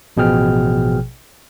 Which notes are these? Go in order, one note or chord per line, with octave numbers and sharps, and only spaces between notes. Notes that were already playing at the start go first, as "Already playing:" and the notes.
A1 B2 F3 G#4 G5 F6